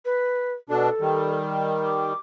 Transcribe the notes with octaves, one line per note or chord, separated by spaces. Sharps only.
B4
B2 D4 A4
D#3 G3
D6